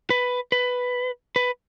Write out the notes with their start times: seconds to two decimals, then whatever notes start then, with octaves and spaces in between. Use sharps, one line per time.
0.10 B4
0.52 B4
1.36 B4